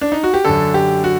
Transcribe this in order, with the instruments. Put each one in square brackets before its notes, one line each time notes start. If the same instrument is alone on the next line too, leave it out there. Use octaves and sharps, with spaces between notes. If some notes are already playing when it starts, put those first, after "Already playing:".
[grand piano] D4
D#4
F#4
G4
F#2 D3 A4
G4
F#4